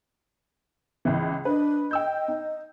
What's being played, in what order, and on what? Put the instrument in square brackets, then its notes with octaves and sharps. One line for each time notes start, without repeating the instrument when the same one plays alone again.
[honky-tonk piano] C#2 E3
[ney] D4 [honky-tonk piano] B4 D#5
[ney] D#5 [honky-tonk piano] G5 E6 G6
[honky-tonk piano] D#4